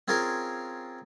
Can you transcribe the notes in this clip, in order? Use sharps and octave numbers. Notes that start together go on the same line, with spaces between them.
C4 C#4 F4 G#4 A#4 F5